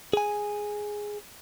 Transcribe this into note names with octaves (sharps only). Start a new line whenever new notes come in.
G#4 G#5